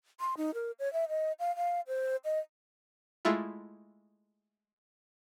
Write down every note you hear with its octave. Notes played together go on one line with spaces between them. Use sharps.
C6
D#4
A#4
C#5
E5
D#5
F5
F5
C5
D#5
G#3 A3 E4 F4